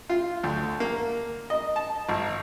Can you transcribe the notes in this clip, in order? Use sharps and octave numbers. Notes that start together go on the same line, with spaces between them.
F4
D2
A#3
D#5
A5
G#1